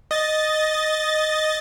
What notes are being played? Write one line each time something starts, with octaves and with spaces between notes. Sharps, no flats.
D#5 A6